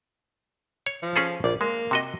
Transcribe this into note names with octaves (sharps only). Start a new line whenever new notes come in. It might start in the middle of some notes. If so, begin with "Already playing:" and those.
C#5
F3
C#4 G#4 A4
A#1 D5
G#3 A#3
C3 F#4 D#5